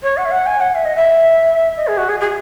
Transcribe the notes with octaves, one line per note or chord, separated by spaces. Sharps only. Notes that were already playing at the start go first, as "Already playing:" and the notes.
C#5
F#5
E5
F#5
G#5
F#5
E5
D#5
E5
D#5
G#4
F#4
G#4
G#4